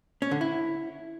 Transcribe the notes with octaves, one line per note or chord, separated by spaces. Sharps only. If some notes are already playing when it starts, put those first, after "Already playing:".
C#4
D3
E4